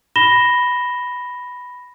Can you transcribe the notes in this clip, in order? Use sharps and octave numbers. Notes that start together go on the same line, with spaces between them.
B5 A#6 E7 G7